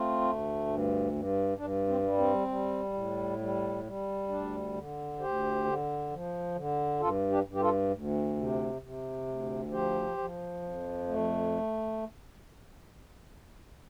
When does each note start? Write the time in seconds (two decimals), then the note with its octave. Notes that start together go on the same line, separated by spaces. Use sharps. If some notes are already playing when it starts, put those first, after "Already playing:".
Already playing: A3 C4 F4
0.22 D2
0.67 G2
1.12 G2
1.57 G2 D4
1.88 C4
2.03 G3
2.18 C4
2.48 G3
2.93 A2
3.38 G3
3.84 G3
4.29 D2 D4
4.74 D3
5.19 D2 G4 C5
5.64 D3
6.11 F3
6.55 D3
7.00 G2 F4 A4
7.30 D4 G4
7.46 G2
7.54 G4
7.60 F4 A4
7.91 D2
8.36 C3
8.82 C3
9.27 D2
9.71 F3 G4 C5
10.18 F3
10.62 F2
11.08 A3